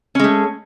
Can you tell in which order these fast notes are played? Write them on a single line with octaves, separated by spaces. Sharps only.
C#4 G#3 A3